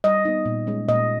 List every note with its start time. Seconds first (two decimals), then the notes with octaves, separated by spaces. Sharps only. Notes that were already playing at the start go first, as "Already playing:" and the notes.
0.04 G3 D#5
0.25 B3 D#4
0.45 A#2
0.67 G#3 C#4
0.88 A#2 D#5